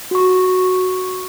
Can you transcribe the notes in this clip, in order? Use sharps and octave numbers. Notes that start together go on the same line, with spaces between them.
F#4 C#6